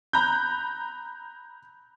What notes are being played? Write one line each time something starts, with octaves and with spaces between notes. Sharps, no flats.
A#5 B5 F#6 G6